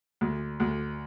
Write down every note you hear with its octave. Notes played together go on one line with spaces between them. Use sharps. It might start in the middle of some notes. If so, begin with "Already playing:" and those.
D2
D2